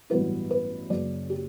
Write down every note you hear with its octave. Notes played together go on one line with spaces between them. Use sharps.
A1 G2 F#3 B3 E4 B4
B4
F#1 F#2 C#3 D5
G4